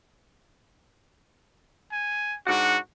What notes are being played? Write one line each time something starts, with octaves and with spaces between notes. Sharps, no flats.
G#5
G#2 D4 F#4 F#5